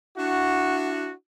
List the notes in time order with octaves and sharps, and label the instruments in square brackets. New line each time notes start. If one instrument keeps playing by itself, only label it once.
[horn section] D4 E4 F#4